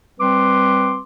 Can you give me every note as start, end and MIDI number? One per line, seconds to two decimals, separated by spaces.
0.20 1.00 55
0.20 1.00 60
0.20 1.00 71
0.20 1.00 84
0.20 1.00 86